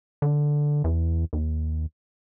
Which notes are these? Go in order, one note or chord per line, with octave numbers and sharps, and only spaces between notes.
D3
E2
D#2